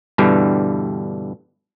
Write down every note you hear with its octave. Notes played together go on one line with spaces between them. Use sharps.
G2 B2 D3 E3 G3